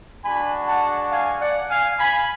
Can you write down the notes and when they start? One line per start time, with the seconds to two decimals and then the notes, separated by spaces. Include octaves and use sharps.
0.24 G#3 D4 F#4 G#5 B5
0.67 F#5 A5
1.10 F5 G#5
1.40 D5 F#5
1.69 F5 G#5
1.98 G#5 B5